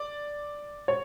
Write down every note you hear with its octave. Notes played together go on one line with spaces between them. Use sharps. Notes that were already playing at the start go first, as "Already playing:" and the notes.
Already playing: D5
C#5